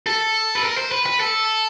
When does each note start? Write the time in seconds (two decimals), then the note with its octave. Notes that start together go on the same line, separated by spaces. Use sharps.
0.07 A4
0.55 B4
0.64 A#4
0.77 C5
0.91 B4
1.06 B4
1.20 A4